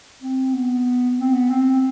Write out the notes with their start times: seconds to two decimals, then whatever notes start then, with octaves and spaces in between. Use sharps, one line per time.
0.22 C4
0.54 B3
1.18 C4
1.34 B3
1.50 C4